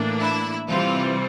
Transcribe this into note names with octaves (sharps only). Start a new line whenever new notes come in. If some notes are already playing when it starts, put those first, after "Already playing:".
Already playing: A2 E3 A#3 D4
E4
C3 E3 G3 C4 F4